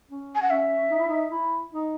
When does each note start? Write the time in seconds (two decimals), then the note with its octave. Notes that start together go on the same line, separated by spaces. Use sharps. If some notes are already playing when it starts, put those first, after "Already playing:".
0.10 C#4
0.35 G#5
0.42 F#5
0.50 C#4 E5
0.91 D#4
0.99 E4
1.07 D#4
1.32 E4
1.73 D#4